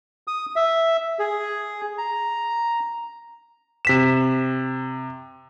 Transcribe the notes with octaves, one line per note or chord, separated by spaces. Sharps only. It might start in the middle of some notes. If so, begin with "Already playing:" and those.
D#6
E5
G#4
A#5
C3 B6 E7